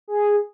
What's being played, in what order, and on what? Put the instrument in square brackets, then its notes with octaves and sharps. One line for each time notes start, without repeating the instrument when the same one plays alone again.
[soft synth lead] G#4